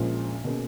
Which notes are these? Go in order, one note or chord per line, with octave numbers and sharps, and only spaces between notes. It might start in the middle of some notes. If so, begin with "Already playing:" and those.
Already playing: A#1 A#2 F3 G#3 C#4
B2 A#3 C#4 G#4